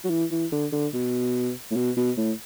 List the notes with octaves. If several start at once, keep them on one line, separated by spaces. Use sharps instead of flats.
F#3
E3
E3
D3
D3
B2
A2
B2
B2
A2